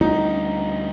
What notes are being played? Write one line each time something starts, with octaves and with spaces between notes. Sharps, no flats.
D2 G3 C#4 D#4